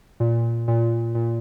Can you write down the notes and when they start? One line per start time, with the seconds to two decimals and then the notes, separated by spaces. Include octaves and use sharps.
0.20 A#2
0.68 A#2
1.15 A#2